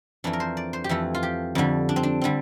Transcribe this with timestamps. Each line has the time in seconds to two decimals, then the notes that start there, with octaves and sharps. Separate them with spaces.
0.24 F2 E3 A3 D4
0.33 A#4
0.40 C5
0.57 D5
0.73 C5
0.84 G4
0.89 F2 E3 A3 A4
1.15 F4
1.23 G4
1.55 F2 D3 G3
1.89 D4
1.96 C4
2.03 D4
2.21 D3 G3 C4